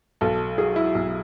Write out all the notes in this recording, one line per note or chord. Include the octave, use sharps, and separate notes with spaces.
B1 A4
F#3 G#4
E4
B1